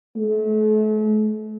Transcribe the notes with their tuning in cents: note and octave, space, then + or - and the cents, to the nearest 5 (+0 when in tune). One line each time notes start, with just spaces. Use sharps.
A3 -40